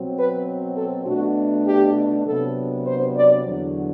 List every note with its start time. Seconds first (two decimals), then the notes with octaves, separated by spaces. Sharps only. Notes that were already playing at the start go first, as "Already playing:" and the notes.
Already playing: B2 F#3 C4
0.15 B4
0.76 A4
1.06 B2 A3 D4 F#4
1.66 G4
2.25 C3 F#3 B3 D4 A4
2.85 C5
3.15 D5
3.45 E2 D3 F#3